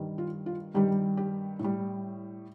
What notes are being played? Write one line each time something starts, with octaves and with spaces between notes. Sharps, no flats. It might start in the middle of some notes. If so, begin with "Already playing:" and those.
Already playing: G2 D#3 G3
F4
F4
G2 D#3 G3 G4
G4
A2
G3